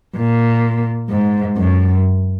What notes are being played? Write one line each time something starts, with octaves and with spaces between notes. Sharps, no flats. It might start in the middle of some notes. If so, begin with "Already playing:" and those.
A#2
G#2
F#2